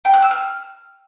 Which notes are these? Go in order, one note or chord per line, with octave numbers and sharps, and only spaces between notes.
G5
F#6
E6
F6